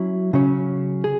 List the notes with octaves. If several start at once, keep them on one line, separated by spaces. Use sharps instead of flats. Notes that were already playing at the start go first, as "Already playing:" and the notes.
Already playing: F#3 C#4 E4
C#3 F#3 C#4
G#4